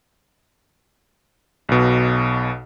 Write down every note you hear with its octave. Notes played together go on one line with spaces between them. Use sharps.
B1 B2